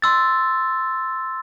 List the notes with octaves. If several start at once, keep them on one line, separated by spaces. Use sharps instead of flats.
C6 E6 A6